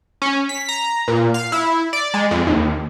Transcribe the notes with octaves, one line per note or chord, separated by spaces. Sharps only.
C#4
B6
A#5
A#2
F5
E4
D5
G#3
F2
D#2